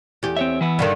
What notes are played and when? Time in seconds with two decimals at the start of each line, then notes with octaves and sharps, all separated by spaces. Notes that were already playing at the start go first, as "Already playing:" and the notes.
0.23 E2 G4
0.37 C4 C#5 E5
0.61 E3 B3 E4
0.79 G2 D3 D#3